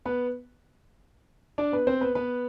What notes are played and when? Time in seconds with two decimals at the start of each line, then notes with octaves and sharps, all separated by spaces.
0.06 B3 B4
1.58 D4 D5
1.72 B3 B4
1.87 C4 C5
2.01 B3 B4
2.15 B3 B4